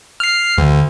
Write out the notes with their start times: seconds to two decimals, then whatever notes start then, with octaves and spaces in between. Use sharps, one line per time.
0.20 F6 C7
0.58 D2